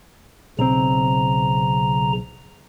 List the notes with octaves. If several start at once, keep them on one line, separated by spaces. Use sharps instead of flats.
B1 C#3 C4 A#5